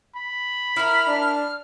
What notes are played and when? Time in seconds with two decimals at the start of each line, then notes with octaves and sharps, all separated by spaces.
0.16 B5
0.76 E4 A#4 F6
1.07 D4